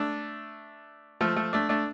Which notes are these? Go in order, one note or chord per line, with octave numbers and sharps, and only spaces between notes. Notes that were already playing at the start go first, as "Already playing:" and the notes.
Already playing: A3 D4
F3 A3
F3 A3
A3 D4
A3 D4